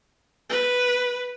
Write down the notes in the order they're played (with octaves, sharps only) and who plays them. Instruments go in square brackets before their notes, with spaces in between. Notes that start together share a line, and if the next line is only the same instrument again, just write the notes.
[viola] B4